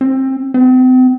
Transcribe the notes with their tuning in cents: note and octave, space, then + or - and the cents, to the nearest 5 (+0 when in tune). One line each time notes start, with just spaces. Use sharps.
C4 +25
C4 -40